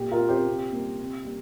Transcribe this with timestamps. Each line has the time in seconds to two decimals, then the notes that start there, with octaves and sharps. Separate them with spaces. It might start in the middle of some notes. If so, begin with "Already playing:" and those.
Already playing: A#2 G4
0.11 F4 A#4
0.20 A#3
0.29 G4 C5
0.47 C3
0.72 G3 A#3
0.99 C3
1.25 G3 A#3